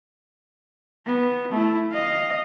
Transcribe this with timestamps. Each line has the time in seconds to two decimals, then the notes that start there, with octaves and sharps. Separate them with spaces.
1.07 B3
1.53 A3 E4
1.92 D#5 F5